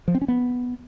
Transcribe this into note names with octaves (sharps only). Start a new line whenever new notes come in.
F3
C4
C#4
B3